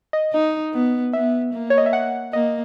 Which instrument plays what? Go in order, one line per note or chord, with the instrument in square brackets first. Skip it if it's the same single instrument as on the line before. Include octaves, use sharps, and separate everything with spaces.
[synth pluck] D#5
[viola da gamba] D#4
B3
[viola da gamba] B3 [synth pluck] E5
[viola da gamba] A#3
[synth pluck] C#5
D#5
E5
F#5
[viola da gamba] A#3 [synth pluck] D#5